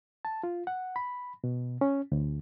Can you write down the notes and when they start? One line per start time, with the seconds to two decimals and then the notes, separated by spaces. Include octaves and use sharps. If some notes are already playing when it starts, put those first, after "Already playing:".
0.25 A5
0.43 F4
0.67 F#5
0.96 B5
1.44 B2
1.81 C#4
2.12 D2